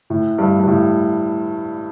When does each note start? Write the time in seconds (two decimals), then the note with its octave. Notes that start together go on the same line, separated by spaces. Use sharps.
0.10 A2
0.38 G2
0.60 G2
0.68 A2